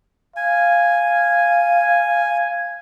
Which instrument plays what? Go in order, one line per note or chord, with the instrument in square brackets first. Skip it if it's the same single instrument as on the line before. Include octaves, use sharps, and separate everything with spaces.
[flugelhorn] F5 [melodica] G#5